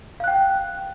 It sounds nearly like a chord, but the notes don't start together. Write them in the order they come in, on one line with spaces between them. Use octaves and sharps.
F5 F#6 G5